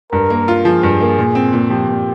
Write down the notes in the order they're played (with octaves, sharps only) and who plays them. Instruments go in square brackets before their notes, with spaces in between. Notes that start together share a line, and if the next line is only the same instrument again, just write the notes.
[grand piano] G2 [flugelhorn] A#4
[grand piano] A#3
F4
[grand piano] F3 [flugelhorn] G#4
[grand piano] G2
A#3
A#2
C4
A#2
[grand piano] F3 [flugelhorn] G4
[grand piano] A#2